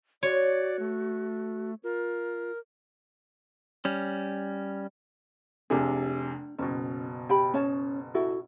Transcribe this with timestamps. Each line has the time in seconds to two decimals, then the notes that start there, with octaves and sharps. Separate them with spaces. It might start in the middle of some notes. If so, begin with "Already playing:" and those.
0.23 F#4 C#5 D5
0.79 A3
1.83 F4 A#4
3.85 G3 C#4
5.70 F1 C3 D4 G#4
6.59 F#1 B2 C#4
7.29 G4 G5 B5
7.54 C#4 C#5 A5
8.14 E4 F#4 A4